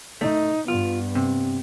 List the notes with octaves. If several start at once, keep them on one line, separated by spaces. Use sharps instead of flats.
A3 D#4
G2 B3 F4
C3